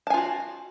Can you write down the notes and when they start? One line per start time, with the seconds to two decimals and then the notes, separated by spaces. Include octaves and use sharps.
0.07 A5
0.10 G#5
0.14 F4
0.17 F#4